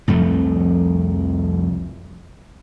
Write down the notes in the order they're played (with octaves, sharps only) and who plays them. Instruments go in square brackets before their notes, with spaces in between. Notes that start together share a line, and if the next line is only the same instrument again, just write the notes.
[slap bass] C2 F2 F3 A3